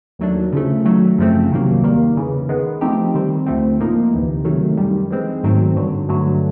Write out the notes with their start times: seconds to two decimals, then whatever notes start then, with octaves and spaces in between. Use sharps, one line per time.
0.19 D#2 D#3 F#3 A3 D4
0.52 C#3 F3 A3
0.85 D#3 F#3 A3
1.18 F#2 C#3 F3 A3 C4
1.51 C2 C3 D#3 F#3 A#3
1.83 D#2 D#3 G3 A#3
2.16 E2 C#3 E3
2.49 D#3 G#3 B3
2.81 F3 A3 C4 D#4 G4
3.15 D#3 G3 C4
3.46 D2 D3 F3 A3 C4
3.80 A2 F3 A#3 D#4
4.13 D2 C3 E3
4.45 C#2 C3 D#3 F#3 A3
4.77 F#2 D#3 G3
5.11 E3 G#3 C4
5.44 G#2 D#3 F#3 A3 C4
5.76 G2 D3 F#3
6.09 G2 D3 F#3 A3